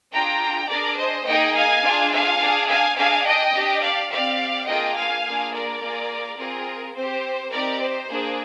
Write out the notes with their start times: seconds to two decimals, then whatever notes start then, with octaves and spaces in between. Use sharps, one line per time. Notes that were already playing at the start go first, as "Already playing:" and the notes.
0.13 D4 F4 G#4 G5 A#5
0.70 D4 G#4 A#4 D5
0.98 C5 D#5
1.27 A#3 D#4 G#4 D#5 G5
1.55 F5 G#5
1.83 D4 F4 G#4
2.12 F5 G#5
2.40 D4 G#4
2.68 F5 G#5
2.97 D4 G#4 F5 G#5
3.26 D#5 G5
3.54 D4 G4
3.82 D5 F5
4.11 C4 G4 D5 F5
4.68 A#3 D4 F4 G#4 D#5 G5
4.96 F5 G#5
5.25 A#3 D4 F4 G#4
5.53 A#4 D5
5.81 A#3 F4 G#4
6.38 C4 F4 G#4 A#4
6.95 C4 G4 C5
7.52 C4 D#4 G4 A#4 D5
7.81 C5
8.09 A#3 D4 G#4